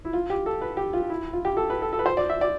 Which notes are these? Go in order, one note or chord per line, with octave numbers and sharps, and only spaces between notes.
E4
F4
G4
A4
B4
G4
F4
E4
F4
G4
A4
B4
A4
A4
B4
C5
D5
E5
D5